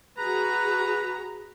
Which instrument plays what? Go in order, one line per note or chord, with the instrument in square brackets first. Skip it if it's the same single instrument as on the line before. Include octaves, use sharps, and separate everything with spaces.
[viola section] F#4 G#4 A#5 [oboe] B4